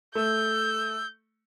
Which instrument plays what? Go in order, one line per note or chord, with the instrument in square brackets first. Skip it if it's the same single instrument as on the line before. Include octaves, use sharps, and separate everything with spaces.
[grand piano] A3 [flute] E6 [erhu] G6